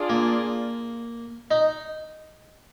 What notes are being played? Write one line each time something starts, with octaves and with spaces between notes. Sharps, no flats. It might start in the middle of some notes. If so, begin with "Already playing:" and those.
Already playing: D4 F4 G#4 D5
A#3
D#4